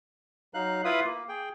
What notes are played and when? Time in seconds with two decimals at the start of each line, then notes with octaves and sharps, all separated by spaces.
0.54 F#3 D#4 F5 F#6
0.85 E4 F4 B4 F5 B5 D#6
1.05 A#3
1.29 G#4 G5